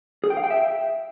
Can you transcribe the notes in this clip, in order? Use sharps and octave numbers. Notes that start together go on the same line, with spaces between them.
G#4
G5
F5
G5
E5